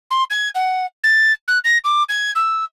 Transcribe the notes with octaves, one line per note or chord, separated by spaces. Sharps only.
C6
G#6
F#5
A6
F#6
A#6
D6
G#6
E6